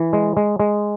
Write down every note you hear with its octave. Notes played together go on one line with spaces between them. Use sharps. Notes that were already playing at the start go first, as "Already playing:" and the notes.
Already playing: E3
G#3
G#3
G#3